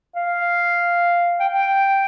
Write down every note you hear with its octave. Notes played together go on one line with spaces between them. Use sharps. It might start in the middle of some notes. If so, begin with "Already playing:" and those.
F5
G5
G5